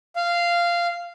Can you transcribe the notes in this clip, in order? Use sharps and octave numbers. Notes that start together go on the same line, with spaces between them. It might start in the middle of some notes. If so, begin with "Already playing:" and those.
F5